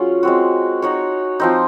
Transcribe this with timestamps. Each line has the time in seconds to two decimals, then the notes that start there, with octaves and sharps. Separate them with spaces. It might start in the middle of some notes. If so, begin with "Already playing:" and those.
Already playing: F#3 C#4 F4 G#4
0.23 G#3 C4 F#4
0.82 D#4 F#4 C#5
1.40 F3 C4 D#4